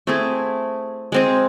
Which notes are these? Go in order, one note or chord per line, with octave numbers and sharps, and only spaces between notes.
A3 C4 E4 G#4
G#3 C4 G#4